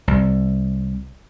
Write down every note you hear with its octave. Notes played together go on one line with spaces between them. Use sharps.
C2